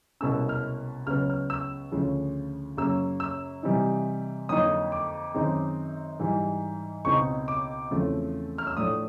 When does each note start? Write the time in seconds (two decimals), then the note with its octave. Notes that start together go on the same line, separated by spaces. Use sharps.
0.21 C2 B2 G#3 C#4 E6
0.49 F6
1.07 C#2 C#3 F#3 B3 F6
1.30 F6
1.50 E6
1.92 D2 C#3 F3
2.77 F#2 C#3 F#3 A#3 E6
3.20 E6
3.63 C3 E3 G3 C4 D#4
4.49 F2 D3 F#3 A#3 D#4 D#6
4.92 D6
5.34 F#2 D#3 G#3 C4 D#4
6.19 G#2 E3 G3
7.05 C#2 B2 G#3 C4 D#4 C#6
7.48 D6
7.91 E2 C#3 F3 A3 C4
8.58 F6
8.67 E6
8.76 A2 F3 A3 D4 D#6